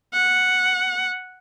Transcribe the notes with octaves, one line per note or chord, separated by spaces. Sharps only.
F#5